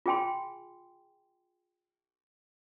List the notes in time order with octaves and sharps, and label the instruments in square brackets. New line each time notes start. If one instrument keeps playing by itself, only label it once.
[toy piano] F4 G#4 G5 G#5 C6